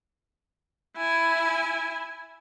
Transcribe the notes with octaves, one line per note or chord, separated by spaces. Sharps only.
E4 G#5